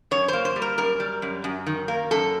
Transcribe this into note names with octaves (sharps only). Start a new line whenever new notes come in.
F#2 C#5
A#3 C5
C5
G3
A#4
F#2 A#4
G3
F#2
F#2
D#3
A#3
F#2 A4